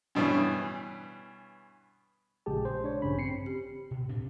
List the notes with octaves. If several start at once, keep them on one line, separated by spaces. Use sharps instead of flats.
G2 B2 E3 C#4
A#1 C#3 G#3 G4 G#4 A5
C5
D4 C#5
A1 G2 C#3 C#4 B5
C4 C7 C#7
G4
B2
A2 C4 D4